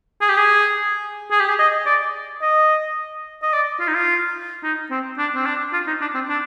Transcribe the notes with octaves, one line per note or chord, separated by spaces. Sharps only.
G#4
G4
G#4
G#4
G4
G#4
D#5
D5
D#5
D#5
D5
F4
D#4
F4
D#4
C4
D4
C4
D4
F4
D#4
D4
C4
D4